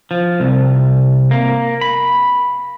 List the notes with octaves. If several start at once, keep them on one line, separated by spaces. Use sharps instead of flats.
F3
C2
A#3
B5